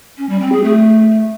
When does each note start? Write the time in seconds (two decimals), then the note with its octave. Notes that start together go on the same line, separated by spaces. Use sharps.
0.18 C#4
0.29 G3
0.41 C4
0.52 G#4
0.64 A3